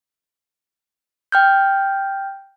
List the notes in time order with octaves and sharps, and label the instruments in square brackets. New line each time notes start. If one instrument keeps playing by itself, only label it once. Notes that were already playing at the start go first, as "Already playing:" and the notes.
[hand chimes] G5 F6 G6